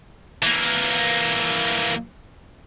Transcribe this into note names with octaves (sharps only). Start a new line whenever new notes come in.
E3 A#3